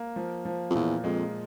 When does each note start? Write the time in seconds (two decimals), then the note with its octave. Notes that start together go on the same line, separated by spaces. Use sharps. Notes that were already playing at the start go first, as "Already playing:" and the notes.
Already playing: A#3
0.16 F3
0.45 F3
0.70 F2
0.74 E2 A#2
1.04 F2 G#3